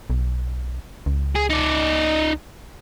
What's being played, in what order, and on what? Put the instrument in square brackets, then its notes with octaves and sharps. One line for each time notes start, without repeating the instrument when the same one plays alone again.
[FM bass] B1
C#2
[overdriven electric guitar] G#4
D#4 D5